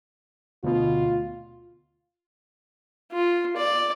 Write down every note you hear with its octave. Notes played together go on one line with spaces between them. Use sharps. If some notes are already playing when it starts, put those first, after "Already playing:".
D2 B2 F4
F4
D5